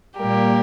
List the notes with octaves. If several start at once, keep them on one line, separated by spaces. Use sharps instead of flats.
A#2 G3 A#3 G4 A#4